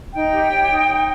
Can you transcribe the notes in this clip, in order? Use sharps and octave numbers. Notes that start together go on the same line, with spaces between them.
D#4 G5
G4
C#5
D#4
D#4